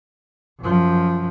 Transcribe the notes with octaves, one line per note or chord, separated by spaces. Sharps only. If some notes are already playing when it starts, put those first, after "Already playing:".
F#2 F3